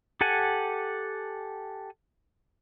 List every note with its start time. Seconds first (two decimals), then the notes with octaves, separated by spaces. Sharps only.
0.21 G4 A4 F#5 G#5